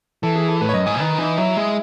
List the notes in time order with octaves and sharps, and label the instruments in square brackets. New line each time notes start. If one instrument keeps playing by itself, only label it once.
[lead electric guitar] E3 [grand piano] A4
[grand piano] G#4
A4
[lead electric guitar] A2 [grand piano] B4
[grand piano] C#5
[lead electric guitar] F#2 [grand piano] D#5
[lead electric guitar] G#2 [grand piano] G#5
[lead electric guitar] D#3 [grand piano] B4
[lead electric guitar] E3 [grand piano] D#4
[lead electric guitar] F#3 [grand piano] E4
[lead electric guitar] G#3